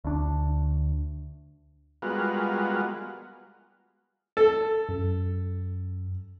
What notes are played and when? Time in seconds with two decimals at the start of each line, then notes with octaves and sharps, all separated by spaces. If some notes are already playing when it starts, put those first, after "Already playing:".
0.04 D2 D4
2.02 G3 G#3 B3 F4 F#4 A#4
4.37 A4
4.89 F#2